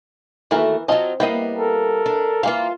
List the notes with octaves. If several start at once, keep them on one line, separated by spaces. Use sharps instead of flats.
D#2 E3 A3 F#4 A#4
F#3 C4 F4 D#5 A5
G3 A#3 B3 E4 D#5 G5
A4 A#4
D4
E3 A#3 F4 F5